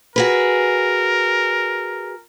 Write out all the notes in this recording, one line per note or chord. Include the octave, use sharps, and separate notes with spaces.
F#4 G#4 A#4 B4